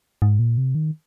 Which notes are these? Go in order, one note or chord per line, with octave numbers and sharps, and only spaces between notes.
G#2
A#2
C3
D#3